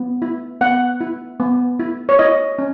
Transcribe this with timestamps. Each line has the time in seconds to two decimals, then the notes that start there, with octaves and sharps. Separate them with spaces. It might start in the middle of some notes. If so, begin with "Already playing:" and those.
Already playing: B3
0.22 E4
0.61 B3 F#5
1.01 E4
1.40 B3
1.79 E4
2.09 C#5
2.19 E4 D#5
2.59 C#4